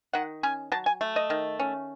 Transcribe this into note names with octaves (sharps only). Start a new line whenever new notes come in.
D#3 F#5
C#4 G#5
F#3 A5
G#5
A3
D#5
D#3
C#4